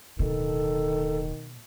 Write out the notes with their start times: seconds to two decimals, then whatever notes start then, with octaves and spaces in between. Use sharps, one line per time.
0.19 D1 B2 D#3 A4